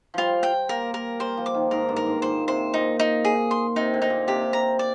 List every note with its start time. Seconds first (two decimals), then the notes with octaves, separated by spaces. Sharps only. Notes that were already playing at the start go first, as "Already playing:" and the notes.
0.14 F3 G3 F4
0.43 G5
0.69 A#3 A#4
0.94 A#4
1.20 G3 C5
1.37 F3
1.46 D6
1.54 D#3
1.71 G#2 A#4
1.89 G2
1.96 A#4
2.06 G#2
2.22 A#2 C5
2.48 C3 C5
2.74 A#2 D#4
2.99 D#4
3.25 G#4
3.51 C6
3.76 C3 D#4
3.94 D3
4.02 D#4
4.10 A#2
4.27 C3 G4
4.53 A#5
4.79 D5